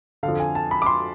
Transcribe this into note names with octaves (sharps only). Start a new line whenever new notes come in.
D3 F5
F2
G#5
A5
B5
D6
C6